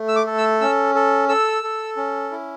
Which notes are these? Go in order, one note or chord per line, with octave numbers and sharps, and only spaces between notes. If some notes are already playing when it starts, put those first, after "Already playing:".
Already playing: A3
E6
D6
A4
E6
C#4 E6
A4
A4 E6
A4
C#4
E4